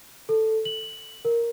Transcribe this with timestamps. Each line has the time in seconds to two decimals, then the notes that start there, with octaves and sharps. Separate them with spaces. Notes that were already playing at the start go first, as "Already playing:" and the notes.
0.29 A4
0.65 F#7
1.25 A#4